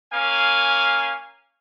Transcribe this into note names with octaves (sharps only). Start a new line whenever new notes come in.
A#3 C#4 F5 G#5